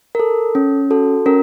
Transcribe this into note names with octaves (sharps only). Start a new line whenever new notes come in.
A#4
A4
C#4
F#4 A4
C#4 A#4